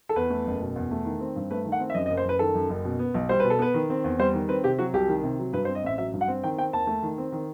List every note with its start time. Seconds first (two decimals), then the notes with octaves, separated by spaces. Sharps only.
0.09 A4
0.16 E2 B4
0.30 A3
0.46 F#1
0.61 B2
0.76 E2
0.91 A3
1.05 D#3
1.20 C4
1.36 G2
1.51 A3 B4
1.65 D#3
1.72 F#5
1.80 C4
1.90 E5
1.94 F#2 D#5
2.06 D#5
2.10 F#1
2.17 C5
2.25 F#1 B4
2.39 D#3 A4
2.55 F#2
2.69 F#1
2.85 B2
2.99 B3
3.14 B1
3.29 G3 C5
3.40 B2 B4
3.50 A4
3.59 B3 B4
3.74 D#3
3.90 C4
4.04 E2
4.19 G3 C5
4.34 D#3
4.48 C4 B4
4.64 C3 G4
4.79 F#3 F#4
4.93 C2 G4
5.09 D#3
5.23 C3
5.39 F#3
5.53 G2 B4
5.65 C5
5.69 C4
5.75 D#5
5.84 A1 E5
5.98 F#3 E5
6.13 G2
6.21 F#5
6.28 C4
6.44 D#3 G5
6.58 C4 G5
6.73 D#2 A5
6.87 A3
7.03 D#3
7.18 C4
7.32 D#3